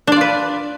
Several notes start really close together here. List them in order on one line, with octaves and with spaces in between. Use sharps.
D4 D5 F4 B4